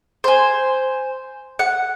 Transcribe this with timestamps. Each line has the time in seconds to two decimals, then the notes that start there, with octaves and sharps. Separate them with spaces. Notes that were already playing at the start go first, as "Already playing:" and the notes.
0.24 C5 G#5
1.59 F#5